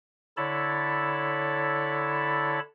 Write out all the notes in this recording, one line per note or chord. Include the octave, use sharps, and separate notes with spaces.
D3 E4 A4 C#5 A5 B5